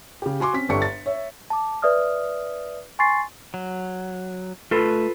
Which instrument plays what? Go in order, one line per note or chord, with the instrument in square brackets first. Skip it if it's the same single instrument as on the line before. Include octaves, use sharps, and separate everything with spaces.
[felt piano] C#3 G4
F#4 G#5 C6 D6
C4 C#4 B6
G1 D4 G4 A4 C#6 C#7
A6
C#5 E5
[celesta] A5 D6
B4 D5 E5 D#6 F6
G#5 C6 C#6 A6 C7
[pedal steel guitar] F#3
[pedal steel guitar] A3 [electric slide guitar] F4 A4 B4